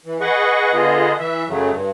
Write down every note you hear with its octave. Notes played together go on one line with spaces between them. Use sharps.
E3
G#4 B4 D#5 F#5 C#6
D3 B3 F4 G#4 D#5
E3 E5
F#2 C#3 F#3 A3
G2